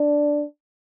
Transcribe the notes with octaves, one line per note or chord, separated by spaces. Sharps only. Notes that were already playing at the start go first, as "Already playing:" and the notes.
Already playing: D4